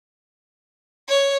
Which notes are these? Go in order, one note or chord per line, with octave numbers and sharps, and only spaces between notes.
C#5